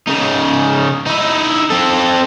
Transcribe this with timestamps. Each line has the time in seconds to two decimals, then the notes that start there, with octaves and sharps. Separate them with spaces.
0.07 C#3 D#4
1.06 D#4 E4
1.70 C4 A4